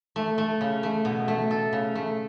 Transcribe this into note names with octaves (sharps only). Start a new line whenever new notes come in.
A3
A3
C#3
A3
B2
A3
A4
C#3
A3